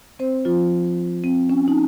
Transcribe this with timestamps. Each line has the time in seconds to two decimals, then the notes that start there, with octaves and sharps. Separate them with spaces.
0.19 C4 C5
0.45 F3 F4
1.24 C4
1.50 C#4
1.68 D#4